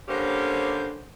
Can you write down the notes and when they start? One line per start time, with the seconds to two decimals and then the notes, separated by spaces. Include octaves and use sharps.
0.08 D3 G3 A#3 C#4 G4 C5